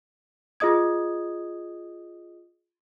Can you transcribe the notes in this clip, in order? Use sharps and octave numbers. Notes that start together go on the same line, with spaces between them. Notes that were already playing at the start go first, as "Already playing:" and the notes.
F4 G#4 D#5 D#6 G#6